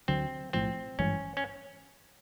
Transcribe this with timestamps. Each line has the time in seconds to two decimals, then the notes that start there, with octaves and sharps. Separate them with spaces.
0.08 D2 D3 F#3 C4
0.53 B1 A2 F3 C4
0.99 G#1 G2 E3 G#3 C#4
1.37 C#4